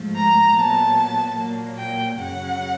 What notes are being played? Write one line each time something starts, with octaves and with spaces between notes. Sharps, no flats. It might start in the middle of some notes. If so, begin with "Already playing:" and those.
Already playing: G#2 F3 A3
A#5
A#2 F#3 B3 A5
A#2 F#3 A#3
G5
F#2 C#3 F#3 F#5